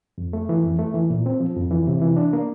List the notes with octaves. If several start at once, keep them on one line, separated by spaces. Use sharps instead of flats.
F2
A3
E3
F2
A3
E3
A#2
C4
F3
F2
E3
C3
E3
D4
A#3